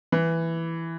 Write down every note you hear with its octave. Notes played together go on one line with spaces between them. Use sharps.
E3